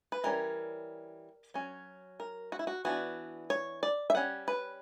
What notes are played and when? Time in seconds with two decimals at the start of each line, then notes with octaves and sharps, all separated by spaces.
0.12 B4
0.24 E3 G3 C#4 A#4
1.54 F#3 C#4
2.20 A#4
2.52 F#4
2.59 E4
2.67 F#4
2.85 E3 B3 D4 F#4
3.50 C#5
3.83 D5
4.10 E5
4.15 G3 C#4 F#5
4.48 B4